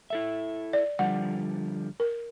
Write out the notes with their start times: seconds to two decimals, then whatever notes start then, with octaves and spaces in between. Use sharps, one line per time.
0.10 E4 A4 E5
0.73 D5
0.99 D3 F3 G3 F#5
2.00 A#4